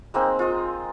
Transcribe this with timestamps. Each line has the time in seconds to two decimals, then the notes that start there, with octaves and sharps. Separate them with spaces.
0.14 G#3 A#3 C4 D#4
0.39 F4 D#5